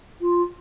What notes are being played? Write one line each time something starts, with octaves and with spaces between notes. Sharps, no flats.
F4